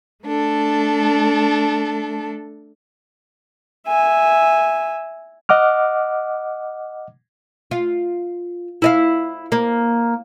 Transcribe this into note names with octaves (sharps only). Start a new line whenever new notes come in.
A3 D4 A4
E5 G#5
D#5 F#5 D6 F6
F4
E4 D#5 F5
A#3